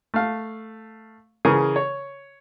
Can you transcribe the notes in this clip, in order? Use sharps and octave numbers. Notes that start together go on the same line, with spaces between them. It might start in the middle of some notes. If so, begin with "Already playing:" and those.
A3 F5
C#3 E3 G#4 A#4 D#6
C#5